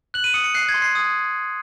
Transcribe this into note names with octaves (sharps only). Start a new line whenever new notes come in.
F#6 F#7
D#7
D#6 C#7
C#7
F#6 C7
G#6
C6
C7
D#6